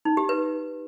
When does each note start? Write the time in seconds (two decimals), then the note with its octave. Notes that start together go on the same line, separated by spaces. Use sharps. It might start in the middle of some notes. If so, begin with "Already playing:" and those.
0.05 D#4
0.17 G4
0.29 B4